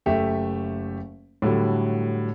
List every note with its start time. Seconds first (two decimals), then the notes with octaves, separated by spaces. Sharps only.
0.06 F#1 A3 G4 E5
1.42 A2 D3 F#3 G3